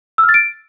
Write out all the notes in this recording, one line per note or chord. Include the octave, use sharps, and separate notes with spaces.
E6
F6
A6
D7